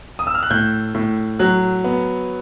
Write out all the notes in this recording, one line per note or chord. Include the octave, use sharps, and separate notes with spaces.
D#6
E6
F6
F#6
A2 G6
A2
F#3 F#6
B3